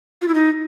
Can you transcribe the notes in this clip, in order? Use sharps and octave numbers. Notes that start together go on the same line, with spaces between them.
F4
E4
D#4